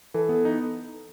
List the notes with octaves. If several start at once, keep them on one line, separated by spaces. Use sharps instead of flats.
E3 A4
B3
D#4